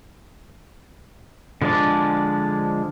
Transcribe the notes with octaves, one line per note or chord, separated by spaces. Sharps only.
D3 F3 G#3 D4 D5